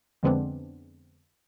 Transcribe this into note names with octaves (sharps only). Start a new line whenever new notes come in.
F2 D3 G#3 B3 C4 D4